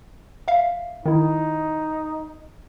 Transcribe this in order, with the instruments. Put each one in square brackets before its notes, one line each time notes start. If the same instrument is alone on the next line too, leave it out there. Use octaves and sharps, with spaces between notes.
[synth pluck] E5 F5
[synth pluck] D#3 E4 [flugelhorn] D#4